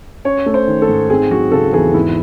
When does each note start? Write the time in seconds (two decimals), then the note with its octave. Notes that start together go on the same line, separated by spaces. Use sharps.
0.25 C#4 C#5
0.46 A3
0.54 C5
0.68 D#3
0.82 A4
0.89 G#2
1.10 C4 G#4
1.31 F#3 F#4
1.52 C#3 A4
1.73 E2 G#4
1.94 G#2 E4